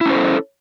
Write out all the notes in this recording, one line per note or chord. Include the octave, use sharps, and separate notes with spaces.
C#4 E4 A4 C5